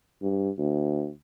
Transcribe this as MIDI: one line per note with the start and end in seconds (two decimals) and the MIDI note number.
0.22 0.50 43
0.58 1.10 38